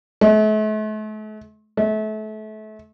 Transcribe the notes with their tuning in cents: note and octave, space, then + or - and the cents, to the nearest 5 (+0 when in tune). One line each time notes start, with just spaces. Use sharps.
A3 -40
A3 -30